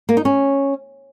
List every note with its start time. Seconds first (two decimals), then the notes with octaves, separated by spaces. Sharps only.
0.09 A#3
0.17 D#4
0.25 C#4